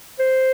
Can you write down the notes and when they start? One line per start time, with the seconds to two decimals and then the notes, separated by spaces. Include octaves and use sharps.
0.19 C5